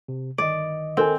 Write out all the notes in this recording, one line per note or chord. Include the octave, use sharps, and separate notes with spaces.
C3
G1 D#3 D5 D#5
C4 A4 A#4 G#5